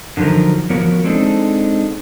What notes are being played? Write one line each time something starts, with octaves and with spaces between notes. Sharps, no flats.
D3 D#3 F3 F#3 A#4
F3 B3 F#4 A#4 C#5
G#3 C4 D4 D#4 A4